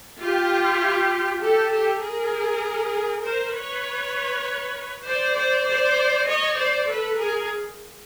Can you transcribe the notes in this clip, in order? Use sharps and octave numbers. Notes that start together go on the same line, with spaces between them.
F4 G4
G4 A4
G4 A4
G#4 A#4
A#4 C5
B4 C#5
C5 D5
C5 D5
C5 D5
C#5 D#5
C5 D5
A4 B4
G#4 A#4